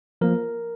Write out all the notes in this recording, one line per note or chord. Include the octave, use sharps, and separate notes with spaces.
F3 A#3 A#4